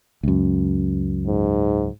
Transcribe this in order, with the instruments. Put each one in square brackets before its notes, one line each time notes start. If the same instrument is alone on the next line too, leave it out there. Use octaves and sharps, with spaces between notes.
[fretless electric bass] C#2 F#2
[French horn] G#2